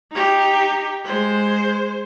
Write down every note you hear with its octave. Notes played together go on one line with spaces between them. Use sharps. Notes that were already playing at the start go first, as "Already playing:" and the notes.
D#4 G4
G#3 C5